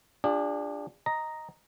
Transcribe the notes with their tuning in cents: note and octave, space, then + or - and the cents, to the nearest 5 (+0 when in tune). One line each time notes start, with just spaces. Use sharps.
D4 +0 F4 +5 G#4 -45
D#5 +0 A#5 +0